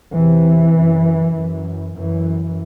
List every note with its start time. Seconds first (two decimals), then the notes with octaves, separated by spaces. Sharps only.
0.12 E2 C3 E3
0.74 F#2
1.35 F#2
1.95 F#2 E3